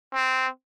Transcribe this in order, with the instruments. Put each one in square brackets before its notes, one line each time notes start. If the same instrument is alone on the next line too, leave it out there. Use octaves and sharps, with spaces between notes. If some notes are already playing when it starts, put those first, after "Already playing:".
[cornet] C4